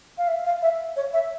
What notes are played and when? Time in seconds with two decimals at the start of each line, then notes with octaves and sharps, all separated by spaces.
0.18 F5
0.28 E5
0.45 F5
0.62 E5
0.96 C#5
1.13 E5